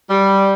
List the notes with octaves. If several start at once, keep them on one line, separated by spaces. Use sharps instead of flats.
G3